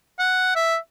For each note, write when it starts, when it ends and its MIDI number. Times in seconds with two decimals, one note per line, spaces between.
0.19 0.55 78
0.56 0.76 76